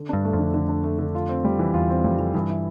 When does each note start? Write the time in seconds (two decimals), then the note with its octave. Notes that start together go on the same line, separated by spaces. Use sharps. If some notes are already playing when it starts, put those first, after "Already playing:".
Already playing: D3
0.09 G2 D4
0.24 A3
0.33 F2
0.39 D3
0.54 D3
0.69 D4
0.84 A3
0.99 D3
1.15 F4
1.29 C4
1.44 G3
1.59 E3
1.74 E2 F4
1.90 C4
2.04 F2 G3
2.19 E3
2.34 G2 E3
2.50 E4